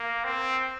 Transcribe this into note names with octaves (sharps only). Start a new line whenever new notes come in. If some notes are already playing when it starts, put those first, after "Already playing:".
Already playing: A#3
C4